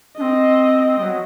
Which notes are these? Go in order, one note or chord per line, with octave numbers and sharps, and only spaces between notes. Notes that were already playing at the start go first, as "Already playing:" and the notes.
C4 D4 D#5
G3
F#3